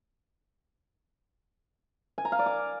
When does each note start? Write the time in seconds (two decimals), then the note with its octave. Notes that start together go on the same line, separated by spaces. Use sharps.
2.18 G#5
2.25 A#5
2.32 F5
2.39 D5
2.46 D6